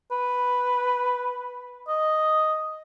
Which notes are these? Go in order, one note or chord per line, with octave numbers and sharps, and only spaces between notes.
B4
D#5